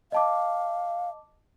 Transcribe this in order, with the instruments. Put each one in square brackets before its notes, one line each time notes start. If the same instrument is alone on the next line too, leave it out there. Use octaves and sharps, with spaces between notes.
[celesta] D#5 A5 D6 [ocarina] F5